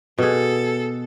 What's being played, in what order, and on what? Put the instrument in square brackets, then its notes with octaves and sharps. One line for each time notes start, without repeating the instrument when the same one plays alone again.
[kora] B2 G#4 [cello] A4